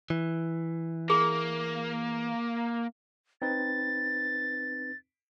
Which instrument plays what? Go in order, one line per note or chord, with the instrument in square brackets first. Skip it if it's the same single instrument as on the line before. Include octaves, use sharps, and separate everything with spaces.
[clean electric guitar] E3
[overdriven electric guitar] A#3 [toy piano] G#4
[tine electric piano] C4 D#4 B4 [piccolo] A6